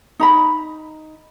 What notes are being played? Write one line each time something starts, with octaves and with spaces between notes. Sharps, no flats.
D#4 A#5 B5